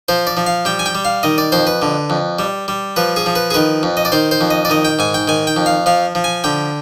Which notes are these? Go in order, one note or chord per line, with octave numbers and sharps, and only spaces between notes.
F3 C5
D5
F3
F5
G3 G5
G#5
G5
G3
F5
D#3 D#5
D5
F2 C5
B4
D3
F2
G3
G3
F3 B4
G#4
F3
B4
G#4
D#3 B4
F2
D#5
D5
D#3 C5
C5
F2
D#5
D5
D#3 D#5
G5
G#2 G#5
G5
D#3 G#5
G5
F2
F5
F3 F5
F3
G#5
D3 G5